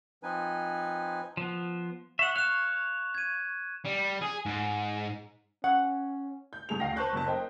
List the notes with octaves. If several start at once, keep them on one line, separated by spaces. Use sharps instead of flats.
F3 C4 D#4 B4 G#5
F3 B3
E5 F#5 C#6 E7
C#5 F5 F#6 E7
G#6 D#7
G3
G#4
G#2
C#4 F#5
G6
A1 G2 G#4 F7
D2 F5 G5 A#6
B4 C5 A5 C#6 F#6 G6
F#1 F#3 A5
A#4 C5 D#5 G5